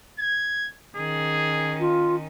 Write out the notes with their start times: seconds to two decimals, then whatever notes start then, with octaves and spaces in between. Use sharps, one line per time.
0.19 G#6
0.97 D#3 C#4 G#4
1.80 F4